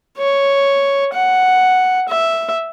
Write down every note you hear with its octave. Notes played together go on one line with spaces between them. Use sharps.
C#5
F#5
E5